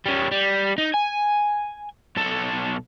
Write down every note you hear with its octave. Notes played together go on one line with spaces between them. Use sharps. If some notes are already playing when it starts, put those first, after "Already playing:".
G3 C#4
G3
D#4
G#5
B1 A4